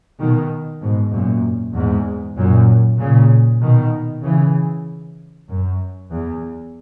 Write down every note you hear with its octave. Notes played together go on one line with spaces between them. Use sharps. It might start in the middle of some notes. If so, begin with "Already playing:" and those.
B2 D#3
G#2 B2
F#2 A#2
E2 G#2
F#2 A#2
A#2 C#3
B2 D#3
C#3 E3
F#2
E2